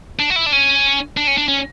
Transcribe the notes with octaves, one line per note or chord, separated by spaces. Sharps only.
D4
F#4
E4
D4
C#4
D4
C#4
D4
C#4